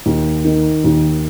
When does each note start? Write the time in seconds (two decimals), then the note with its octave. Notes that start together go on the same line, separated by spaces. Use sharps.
0.06 D#2
0.45 D#3
0.84 D#2